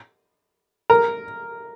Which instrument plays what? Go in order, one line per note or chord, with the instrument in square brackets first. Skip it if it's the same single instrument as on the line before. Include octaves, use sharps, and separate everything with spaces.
[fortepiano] A#4